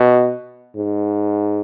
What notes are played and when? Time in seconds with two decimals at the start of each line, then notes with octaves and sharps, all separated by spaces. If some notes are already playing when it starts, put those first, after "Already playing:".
Already playing: B2
0.76 G#2